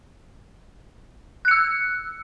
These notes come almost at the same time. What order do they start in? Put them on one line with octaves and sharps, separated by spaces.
F#6 C#7 E6